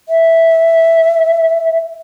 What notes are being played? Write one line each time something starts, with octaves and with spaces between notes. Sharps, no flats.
E5